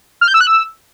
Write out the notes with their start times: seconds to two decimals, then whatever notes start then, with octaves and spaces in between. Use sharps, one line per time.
0.21 F6
0.28 G6
0.34 E6
0.41 F#6
0.47 E6